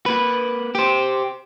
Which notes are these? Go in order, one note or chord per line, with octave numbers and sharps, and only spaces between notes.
A#3 B4
G4 C5